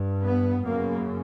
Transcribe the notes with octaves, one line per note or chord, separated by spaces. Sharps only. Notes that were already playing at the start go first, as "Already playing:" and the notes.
Already playing: G2
B3
F#2 C#3 A#3